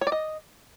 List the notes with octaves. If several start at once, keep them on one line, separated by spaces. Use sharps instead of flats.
C#5
D5
D#5